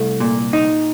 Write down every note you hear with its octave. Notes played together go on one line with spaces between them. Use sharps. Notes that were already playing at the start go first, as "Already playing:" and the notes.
Already playing: C2 A3
A#2
D#4